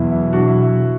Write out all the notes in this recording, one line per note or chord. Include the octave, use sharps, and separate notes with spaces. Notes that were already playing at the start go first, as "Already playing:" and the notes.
Already playing: E2 B2 F#3 E4
E4
D4 F#4
E4
E4